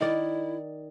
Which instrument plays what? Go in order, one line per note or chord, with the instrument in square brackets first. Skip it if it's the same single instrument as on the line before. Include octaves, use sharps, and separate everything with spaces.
[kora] D#3 D5 [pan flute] E4